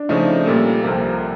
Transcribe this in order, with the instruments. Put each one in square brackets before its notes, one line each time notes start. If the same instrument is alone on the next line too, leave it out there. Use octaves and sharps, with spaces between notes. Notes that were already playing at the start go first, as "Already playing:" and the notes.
Already playing: [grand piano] D4
[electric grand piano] C#3 F3 A3 [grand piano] D#4
[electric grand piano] A#2 G3 A#3 [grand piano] A4
[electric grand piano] C2 C3 F3 [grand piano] A#4